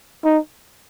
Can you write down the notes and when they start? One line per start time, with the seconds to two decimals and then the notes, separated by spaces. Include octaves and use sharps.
0.24 D#4